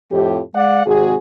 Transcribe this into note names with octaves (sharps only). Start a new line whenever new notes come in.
F2 A2 G4
G#3 D5 F5 F#5
G#1 C3 F#4 G#4